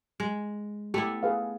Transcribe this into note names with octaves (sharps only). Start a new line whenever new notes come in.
G#3
A3 B3 E4 G4
G#4 B4 F5